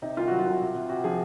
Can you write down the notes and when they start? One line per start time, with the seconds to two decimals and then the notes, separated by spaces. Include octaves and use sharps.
0.02 C3 D#4
0.17 C2 F4
0.28 F#3 F#4
0.39 F4
0.46 C2
0.61 C3
0.75 C3
0.89 C3 F#4
1.04 F3 G#4